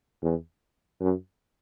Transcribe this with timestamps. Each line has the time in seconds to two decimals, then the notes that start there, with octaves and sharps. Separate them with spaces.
0.23 E2
1.00 F#2